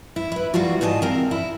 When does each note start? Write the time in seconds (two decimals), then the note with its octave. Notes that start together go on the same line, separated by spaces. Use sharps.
0.16 E4
0.32 E4 B4
0.54 F#3 G3 A#3 F4 F#4
0.81 G#2 G3 G#3 D#5 A5
1.02 C4 A#4 F5
1.31 E4